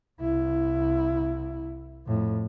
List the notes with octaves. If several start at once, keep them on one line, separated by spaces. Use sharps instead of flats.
C2 E4
F2 A2